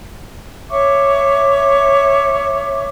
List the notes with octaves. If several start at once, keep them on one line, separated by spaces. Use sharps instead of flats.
C#5 E5 C#6 D6